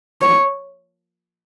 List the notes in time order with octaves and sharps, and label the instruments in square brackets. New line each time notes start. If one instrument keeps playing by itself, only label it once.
[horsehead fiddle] C#5